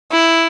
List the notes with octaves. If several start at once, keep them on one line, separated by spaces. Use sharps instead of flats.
E4